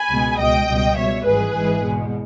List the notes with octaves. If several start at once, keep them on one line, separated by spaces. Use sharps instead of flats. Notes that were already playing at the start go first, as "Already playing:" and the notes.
Already playing: G#5 B5
C#2 B2 G#3
C#2 B2 G#3 D#5 G5
C#2 B2 G3
C#2 B2 G3 C#5 E5
G#1 G#2 E3 G3 G#4 B4
G#1 G#2 E3 G#3
E2 B2 G#3